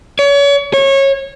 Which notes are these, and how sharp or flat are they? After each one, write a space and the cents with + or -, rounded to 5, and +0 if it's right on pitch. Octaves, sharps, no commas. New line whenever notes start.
C#5 +35
C#5 -25